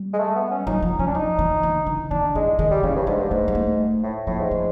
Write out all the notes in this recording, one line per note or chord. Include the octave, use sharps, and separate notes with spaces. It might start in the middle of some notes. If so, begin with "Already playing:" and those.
Already playing: G3
G#3
A3
B3
C#4
F#3 D#4
F3
F3 C#4
D4
F3 D#4
E3
D3
E3
D#3 D4
E3 G#3
D#3 G#3
G3
C#3 E3
G2
G#2 G#3
G2
G#2 A3
G#3
A3
A2
A2 F3
G#2
F3